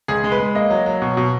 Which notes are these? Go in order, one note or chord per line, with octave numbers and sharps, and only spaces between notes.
C#2 G#4
G#3
B4
G#3
A#3 D#5
F#3
F#3
B2
B2